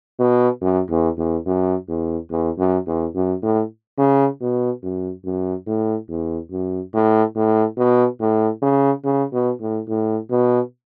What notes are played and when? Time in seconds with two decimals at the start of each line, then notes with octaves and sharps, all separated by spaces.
0.19 B2
0.61 F#2
0.90 E2
1.18 E2
1.46 F#2
1.88 E2
2.31 E2
2.58 F#2
2.87 E2
3.15 F#2
3.43 A2
3.98 C#3
4.41 B2
4.83 F#2
5.25 F#2
5.67 A2
6.09 E2
6.51 F#2
6.94 A2
7.36 A2
7.77 B2
8.20 A2
8.62 C#3
9.04 C#3
9.32 B2
9.61 A2
9.88 A2
10.31 B2